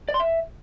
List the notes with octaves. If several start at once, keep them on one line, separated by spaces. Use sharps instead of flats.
D5
C6
E5